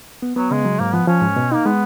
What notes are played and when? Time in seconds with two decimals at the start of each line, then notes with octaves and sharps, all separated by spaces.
0.22 B3
0.36 F#3 B3
0.51 C#3 G#3
0.65 F#3
0.80 G#2 A#3
0.93 F3 B3
1.07 F3 C#4
1.22 G#2
1.36 B2
1.52 A#3 D#4
1.65 G#3 B3